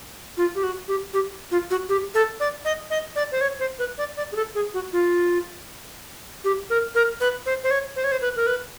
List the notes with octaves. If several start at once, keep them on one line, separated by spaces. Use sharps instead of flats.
F4
G4
F#4
G4
G4
F4
F#4
G4
A4
D5
D#5
D#5
D5
C5
C#5
C5
B4
D5
D5
G#4
A4
G#4
F#4
F4
G4
A#4
A#4
B4
C5
C5
C#5
C5
C#5
C5
B4
A#4
B4